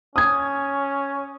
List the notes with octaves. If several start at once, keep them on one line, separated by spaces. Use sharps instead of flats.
C#4 D#6 G#6